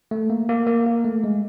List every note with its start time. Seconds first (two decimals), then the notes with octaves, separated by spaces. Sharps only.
0.11 A3
0.30 A#3
0.49 A#3
0.67 A#3
0.86 A#3
1.04 A3
1.24 G#3